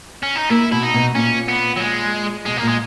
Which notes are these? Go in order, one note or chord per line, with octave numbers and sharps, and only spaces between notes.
C#4
D#4
A#3 E4
B2 E4
D#4
B2
A#2 C#4
B3
F#3
G#3
B2 G#3
A#3
A#2
G#3